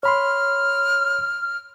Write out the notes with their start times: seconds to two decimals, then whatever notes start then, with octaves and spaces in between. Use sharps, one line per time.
0.03 C#5 B5 C6 F6